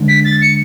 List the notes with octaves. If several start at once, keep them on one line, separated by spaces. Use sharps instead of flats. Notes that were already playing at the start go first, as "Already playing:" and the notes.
Already playing: D3 G#3 D4
B6
A6
C#7